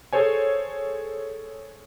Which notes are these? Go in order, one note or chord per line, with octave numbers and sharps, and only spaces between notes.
G#4 A4 C5 C#5 G#5